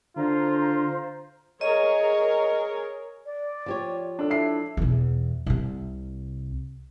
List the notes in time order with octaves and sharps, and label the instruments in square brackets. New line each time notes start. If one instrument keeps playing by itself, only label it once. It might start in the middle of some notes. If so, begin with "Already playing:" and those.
[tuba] D3 [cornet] F4 [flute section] C5 A#5
[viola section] G#4 A#4 C#5 [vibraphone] D#5
[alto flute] D5
[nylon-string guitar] F3 G4 C#5
[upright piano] D4 A4
[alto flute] E4 [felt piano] E5 C7
[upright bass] E2 B2
C2 C3